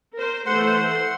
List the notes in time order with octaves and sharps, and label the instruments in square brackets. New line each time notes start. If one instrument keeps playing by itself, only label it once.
[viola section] A#4 C5
[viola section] E3 A3 C5 [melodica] F#5 C6